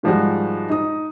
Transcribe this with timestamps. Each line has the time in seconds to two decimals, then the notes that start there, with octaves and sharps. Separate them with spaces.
0.03 G#2 D#3 F3 G3 G#3 F#4
0.70 D#4 D#6